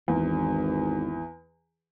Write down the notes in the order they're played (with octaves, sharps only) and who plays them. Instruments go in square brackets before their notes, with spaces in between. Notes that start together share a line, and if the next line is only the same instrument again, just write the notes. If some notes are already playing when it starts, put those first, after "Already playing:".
[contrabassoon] G#1 [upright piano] E2